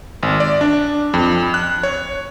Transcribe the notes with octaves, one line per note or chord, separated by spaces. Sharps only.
G#1
D5
D4
F2
F#6
C#5